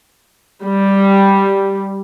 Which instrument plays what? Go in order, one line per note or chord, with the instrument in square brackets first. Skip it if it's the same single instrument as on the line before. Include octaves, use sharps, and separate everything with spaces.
[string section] G3